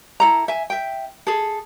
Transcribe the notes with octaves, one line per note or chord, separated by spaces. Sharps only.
E4 A4 A#5
E5 G#5
E5 G5
G#4 A4